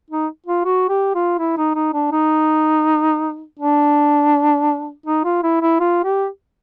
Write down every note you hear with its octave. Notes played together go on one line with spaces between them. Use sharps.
D#4
F4
F#4
G4
F4
E4
D#4
D#4
D4
D#4
D4
D#4
F4
E4
E4
F4
G4